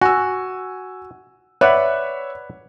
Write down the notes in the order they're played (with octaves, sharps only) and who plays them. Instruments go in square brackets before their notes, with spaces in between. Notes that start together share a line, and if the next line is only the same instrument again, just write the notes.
[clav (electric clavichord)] F#4 [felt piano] G#5 E6
[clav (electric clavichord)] B4 D5 F#5 [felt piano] C#5 E5